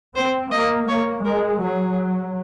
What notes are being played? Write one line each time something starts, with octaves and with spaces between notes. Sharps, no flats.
C4 C5
A#3 D#5
A#3 C#5
G#3 A#4
F#3 G#4